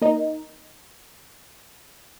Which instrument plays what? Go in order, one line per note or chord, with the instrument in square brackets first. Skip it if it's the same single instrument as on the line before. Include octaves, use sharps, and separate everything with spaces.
[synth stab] A#3 D#4